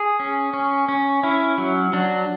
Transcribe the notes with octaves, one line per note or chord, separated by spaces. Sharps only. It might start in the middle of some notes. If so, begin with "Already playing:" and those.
Already playing: G#4
C#4
C#4
C#4
C#4 E4
F#3
F#3 D4